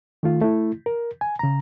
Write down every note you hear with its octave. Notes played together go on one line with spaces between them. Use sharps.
D#3 A3 F4
A3 E4
A#4
G#5
C#3 A#5